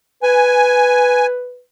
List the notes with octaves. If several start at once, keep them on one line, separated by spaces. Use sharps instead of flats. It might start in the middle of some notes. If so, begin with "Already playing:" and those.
B4 G#5